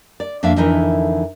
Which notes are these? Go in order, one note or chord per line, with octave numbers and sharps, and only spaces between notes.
D5
F2 A#3 D4 E5 F5
F2 D3 E3 D#4 E4 A#4